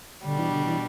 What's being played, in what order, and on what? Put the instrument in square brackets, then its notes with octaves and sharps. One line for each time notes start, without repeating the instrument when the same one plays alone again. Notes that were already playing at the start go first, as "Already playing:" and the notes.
[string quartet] B2 G3 D4 [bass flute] D3
[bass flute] E3
D3
E3